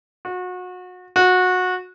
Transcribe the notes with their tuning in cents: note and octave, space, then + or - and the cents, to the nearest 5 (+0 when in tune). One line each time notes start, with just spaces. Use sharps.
F#4 -30
F#4 -20